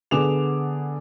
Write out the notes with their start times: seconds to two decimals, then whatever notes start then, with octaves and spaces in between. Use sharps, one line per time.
0.11 D3 B3 G#4 D6 E7 F7